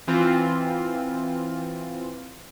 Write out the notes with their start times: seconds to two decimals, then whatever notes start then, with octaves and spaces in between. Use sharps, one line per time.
0.08 E3 C4 F4